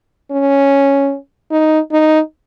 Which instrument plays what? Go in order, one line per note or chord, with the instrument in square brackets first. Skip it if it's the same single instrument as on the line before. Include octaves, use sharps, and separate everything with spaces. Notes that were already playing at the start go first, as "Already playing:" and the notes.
[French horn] C#4
D#4
D#4